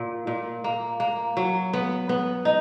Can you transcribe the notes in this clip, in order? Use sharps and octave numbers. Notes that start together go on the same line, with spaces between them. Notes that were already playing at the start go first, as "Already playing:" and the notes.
Already playing: A#2
A#2
A#3
A#3
F#3
B3
B3
D#4